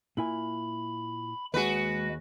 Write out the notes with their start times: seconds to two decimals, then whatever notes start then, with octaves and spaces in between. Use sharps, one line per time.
0.17 A#2 E4 G#5 B5
1.54 D#2 G#3 F#4 G#4 B4